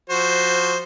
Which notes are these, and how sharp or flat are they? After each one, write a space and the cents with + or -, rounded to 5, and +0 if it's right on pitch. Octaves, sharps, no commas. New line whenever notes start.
F3 +15 F#4 +0 C5 +0